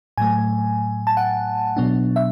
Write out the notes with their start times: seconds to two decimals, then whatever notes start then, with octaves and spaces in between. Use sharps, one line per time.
0.18 A2 F#3 A3 G#5
1.07 A5
1.17 F#5
1.77 B2 F#3 B3 D4
2.16 E5